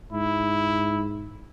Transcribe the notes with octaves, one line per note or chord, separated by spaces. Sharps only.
G#2 E4